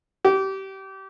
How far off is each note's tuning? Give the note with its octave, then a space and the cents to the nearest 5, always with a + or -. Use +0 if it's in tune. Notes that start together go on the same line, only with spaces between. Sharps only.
G4 -25